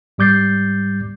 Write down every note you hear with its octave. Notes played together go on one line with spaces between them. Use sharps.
G#2 G3 D6 G6 A6 C7